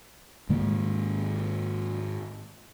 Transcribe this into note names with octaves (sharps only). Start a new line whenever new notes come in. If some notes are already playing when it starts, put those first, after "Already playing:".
G#2 D#3 G#3 A#3